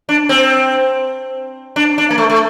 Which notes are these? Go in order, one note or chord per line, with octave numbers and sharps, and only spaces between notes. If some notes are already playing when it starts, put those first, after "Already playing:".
D4
C4
D4
D4
A#3
A3
A3